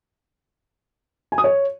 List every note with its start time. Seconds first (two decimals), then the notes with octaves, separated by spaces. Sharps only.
1.32 G#5
1.38 D#6
1.44 C#5